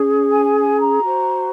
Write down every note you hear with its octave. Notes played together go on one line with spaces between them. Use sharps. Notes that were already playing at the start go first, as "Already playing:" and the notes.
Already playing: C#4 G#4
G#5
G#5
G#5
A#5
F#4 C5